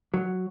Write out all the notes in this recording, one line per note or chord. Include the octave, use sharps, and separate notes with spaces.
F#3